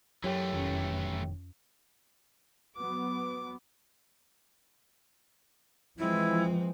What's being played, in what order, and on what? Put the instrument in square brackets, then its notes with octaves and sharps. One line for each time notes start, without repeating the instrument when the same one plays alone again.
[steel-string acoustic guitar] F#2 G4 [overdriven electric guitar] E3 A3 [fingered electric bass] F#3
[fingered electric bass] F1 D#3 [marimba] F2 C#4
[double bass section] F#3 B3 [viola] D6
[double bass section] E3 F3 [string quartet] G#3 C4 [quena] E4